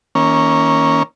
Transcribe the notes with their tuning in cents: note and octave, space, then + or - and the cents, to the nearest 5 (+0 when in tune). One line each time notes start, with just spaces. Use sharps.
D#3 +45 A#3 +5 C#4 +0